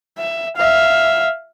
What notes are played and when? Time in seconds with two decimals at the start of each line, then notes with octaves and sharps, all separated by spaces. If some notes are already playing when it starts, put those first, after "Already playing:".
0.18 E5
0.57 E5 F5